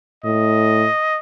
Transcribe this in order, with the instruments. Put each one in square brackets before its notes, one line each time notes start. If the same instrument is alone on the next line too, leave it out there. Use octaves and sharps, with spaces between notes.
[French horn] A2 [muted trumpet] D#5